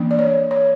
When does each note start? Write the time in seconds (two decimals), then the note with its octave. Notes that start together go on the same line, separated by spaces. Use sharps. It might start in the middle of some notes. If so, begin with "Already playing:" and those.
Already playing: E3 A#3 D4
0.11 D5
0.19 C#5
0.51 C#5